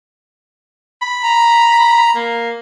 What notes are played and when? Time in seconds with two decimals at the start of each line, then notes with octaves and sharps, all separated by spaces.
1.02 B5
1.23 A#5
2.15 A#3